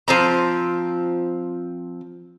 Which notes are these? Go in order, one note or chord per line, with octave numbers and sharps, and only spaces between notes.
F3 C4 A#5